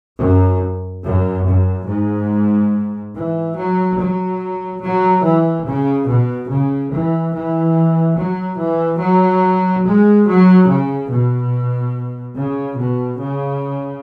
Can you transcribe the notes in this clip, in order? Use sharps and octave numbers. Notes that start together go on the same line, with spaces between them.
F#2
F#2
F#2
G#2
E3
F#3
F#3
F#3
E3
C#3
B2
C#3
E3
E3
F#3
E3
F#3
G#3
F#3
C#3
B2
C#3
B2
C#3